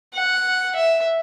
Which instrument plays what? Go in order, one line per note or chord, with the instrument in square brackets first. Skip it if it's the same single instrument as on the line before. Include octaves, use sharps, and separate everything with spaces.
[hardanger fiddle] F#5
E5